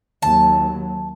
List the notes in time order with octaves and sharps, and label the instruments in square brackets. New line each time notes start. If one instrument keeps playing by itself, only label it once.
[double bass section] D#2 F#3 [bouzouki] A5